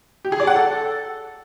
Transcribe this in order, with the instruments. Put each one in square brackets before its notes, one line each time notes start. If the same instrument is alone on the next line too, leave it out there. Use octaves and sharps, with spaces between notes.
[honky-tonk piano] G4
G#4
D5
F#5
A4